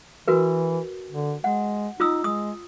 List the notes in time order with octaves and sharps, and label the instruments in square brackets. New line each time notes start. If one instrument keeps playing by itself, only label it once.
[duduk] E3 [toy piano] F#4 A#4 B4
[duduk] D3
[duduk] G#3 [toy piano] F#5
[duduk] D#4 [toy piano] F4 D#6 E6
[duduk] G#3 [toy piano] D#6